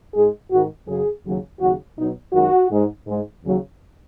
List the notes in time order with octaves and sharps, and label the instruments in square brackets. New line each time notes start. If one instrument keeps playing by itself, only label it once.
[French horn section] G#2 G#3 G#4
G#2 D#3 G#3 F#4
F#2 C#3 F#3 G#4
D#2 C#3 F#3
D#2 C#3 F#3 F#4
B2 F#3 D#4
F#2 D#3 G#3 F#4
G#2 G#3
G#2 G#3
D#2 C#3 F#3